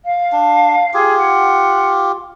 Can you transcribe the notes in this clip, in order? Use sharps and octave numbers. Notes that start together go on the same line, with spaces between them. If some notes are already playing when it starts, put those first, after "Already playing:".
F5
D4
F4 G4 G#4
F#5